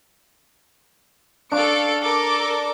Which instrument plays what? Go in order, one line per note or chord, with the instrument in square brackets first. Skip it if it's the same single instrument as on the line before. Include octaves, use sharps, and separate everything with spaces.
[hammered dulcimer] D4 C#6 [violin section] A4 F5 D7
[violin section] A4 A#4 D6